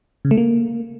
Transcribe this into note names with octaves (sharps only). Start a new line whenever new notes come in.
C#3
A3
A#3